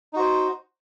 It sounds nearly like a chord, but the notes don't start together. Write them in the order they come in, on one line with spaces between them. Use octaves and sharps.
D#4 F#4 C5